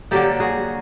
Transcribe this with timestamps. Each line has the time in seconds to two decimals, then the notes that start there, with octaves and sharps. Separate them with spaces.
0.11 D3 F#3 A#3 G4 A4
0.40 F#4 G#4